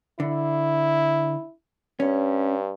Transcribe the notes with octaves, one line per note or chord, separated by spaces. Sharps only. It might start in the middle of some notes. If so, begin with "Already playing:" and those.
D3 E4
G2 C#4